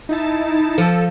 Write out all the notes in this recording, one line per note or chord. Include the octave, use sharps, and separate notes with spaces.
D#4 E4 A5
F3 A4